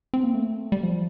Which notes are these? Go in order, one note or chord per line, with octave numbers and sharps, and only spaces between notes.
C4
A#3
A3
G3
F3